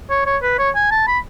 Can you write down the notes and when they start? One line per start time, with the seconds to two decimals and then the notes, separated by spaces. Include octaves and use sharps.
0.10 C#5
0.26 C#5
0.42 B4
0.59 C#5
0.75 G#5
0.91 A5
1.07 B5